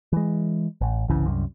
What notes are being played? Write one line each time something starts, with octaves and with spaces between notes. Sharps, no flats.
E3 G#3
A1
G1 C2 C#3 E3
C2 F#2